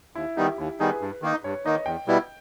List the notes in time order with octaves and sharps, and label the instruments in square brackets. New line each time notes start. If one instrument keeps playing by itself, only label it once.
[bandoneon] D#2 [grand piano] E4
[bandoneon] D#3 G3 B3 D#4 [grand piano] G4
[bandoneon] D#2 [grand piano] E4
[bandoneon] D#3 G3 B3 D#4 [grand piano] G#4
[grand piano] B4
[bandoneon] G2
D#3 A#3 D#4
[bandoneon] G2 [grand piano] C#5
[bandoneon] D#3 A#3 D#4 [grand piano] D#5
[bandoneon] E2 [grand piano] G5
[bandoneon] B2 G3 B3 E4